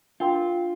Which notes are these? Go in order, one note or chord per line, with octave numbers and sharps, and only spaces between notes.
D4 F4 A#4 G5 C6